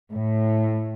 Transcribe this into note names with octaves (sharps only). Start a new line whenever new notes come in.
A2